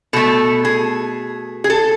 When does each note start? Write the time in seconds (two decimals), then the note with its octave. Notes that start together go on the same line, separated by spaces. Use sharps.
0.13 B2 A3 A4
0.65 G#4
1.64 G#4
1.70 A4